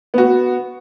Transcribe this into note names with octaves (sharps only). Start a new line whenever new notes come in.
B3 F#4